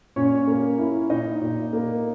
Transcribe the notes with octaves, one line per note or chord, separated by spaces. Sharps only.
A#2 C#4 C#5
A#3
E4
A#2 D#4 D#5
A#2
A#3